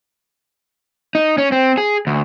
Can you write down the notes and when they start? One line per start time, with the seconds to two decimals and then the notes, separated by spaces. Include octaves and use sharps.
1.15 D#4
1.38 C#4
1.52 C4
1.78 G#4
2.07 D2